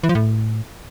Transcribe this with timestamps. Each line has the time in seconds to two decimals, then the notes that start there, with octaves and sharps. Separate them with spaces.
0.03 E3
0.09 F3
0.15 A2